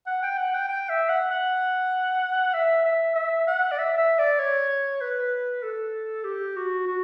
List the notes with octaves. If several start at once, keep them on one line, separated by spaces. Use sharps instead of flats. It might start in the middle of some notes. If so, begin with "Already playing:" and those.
F#5
G5
F#5
G5
G5
E5
F#5
F#5
E5
E5
E5
F#5
D5
E5
E5
D5
C#5
B4
A4
G4
F#4
F#4